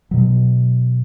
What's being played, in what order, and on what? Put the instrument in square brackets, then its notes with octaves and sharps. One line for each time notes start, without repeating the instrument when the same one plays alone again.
[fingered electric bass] B2 F#3